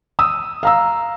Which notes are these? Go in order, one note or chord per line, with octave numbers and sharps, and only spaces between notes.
D#6 E6
F5 A#5 E6